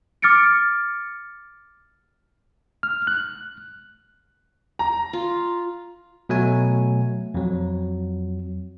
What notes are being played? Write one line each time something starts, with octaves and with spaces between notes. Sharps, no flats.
D6 F6 A6 C#7 D7
F6
F#6
A#5
F4
B2 F#3 A3 G#5
F2 F#3